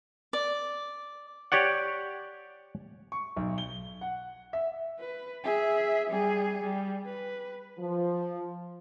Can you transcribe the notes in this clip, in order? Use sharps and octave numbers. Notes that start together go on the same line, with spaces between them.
D5
G4 C#5 D5 F#5
C#6
B1
G7
F#5
E5
B4
G#4 E5
G3 G#4
G3
B4
F3